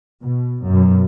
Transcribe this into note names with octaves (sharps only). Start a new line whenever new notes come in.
B2
F#2 B2